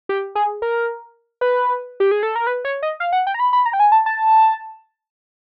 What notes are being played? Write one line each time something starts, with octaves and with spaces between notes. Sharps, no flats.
G4
G#4
A#4
B4
G4
G#4
A4
A#4
B4
C#5
D#5
F5
F#5
G5
A#5
B5
B5
A#5
G5
G#5
A5
A5